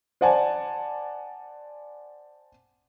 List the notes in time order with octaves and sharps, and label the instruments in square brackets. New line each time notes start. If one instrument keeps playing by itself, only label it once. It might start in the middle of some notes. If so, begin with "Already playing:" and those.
[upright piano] C5 D5 F#5 G#5 A5